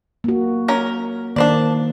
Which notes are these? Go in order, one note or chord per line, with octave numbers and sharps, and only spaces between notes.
A#3 F#4
C#4 A#4
D#3 A#3 D4 C5 D5